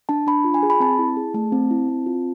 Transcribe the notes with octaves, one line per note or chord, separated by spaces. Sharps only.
D4 A5
D4 B5
F4
G#5
G#4
B5
C4 A5
E4
G#4
A3 A5
C4
E4
C4
F4